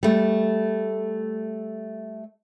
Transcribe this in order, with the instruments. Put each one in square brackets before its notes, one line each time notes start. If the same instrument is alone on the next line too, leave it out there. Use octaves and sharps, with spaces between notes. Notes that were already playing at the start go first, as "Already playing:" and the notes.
[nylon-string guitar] G3 A3